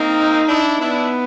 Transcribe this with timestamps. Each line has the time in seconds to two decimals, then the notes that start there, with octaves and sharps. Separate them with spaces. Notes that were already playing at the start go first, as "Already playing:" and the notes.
Already playing: A#3 C4 D#4
0.48 D4 E4
0.80 B3 D4 E4